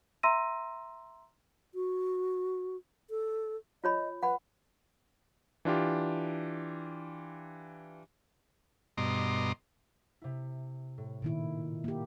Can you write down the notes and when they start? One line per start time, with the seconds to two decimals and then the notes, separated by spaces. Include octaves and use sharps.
0.23 E5 A#5 C6 E6 A#6 D#7
1.75 F#4
3.10 A4
3.84 F4 C#5 D#5 B5
4.23 B4 F#5 B5
5.65 E3 D4 F4 G4
8.98 G2 B2 D#5 A#5 C6 D6
10.22 C3 E4
10.98 A2
11.22 A#2 D#3 E4 D7
11.84 A#3 G4